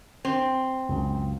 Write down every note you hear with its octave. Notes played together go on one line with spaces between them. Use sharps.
C4
C#2 F#2